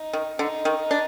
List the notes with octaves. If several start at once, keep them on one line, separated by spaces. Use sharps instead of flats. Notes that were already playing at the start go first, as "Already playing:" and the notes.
Already playing: D#4
D#3
D3 D#4
D#3
D4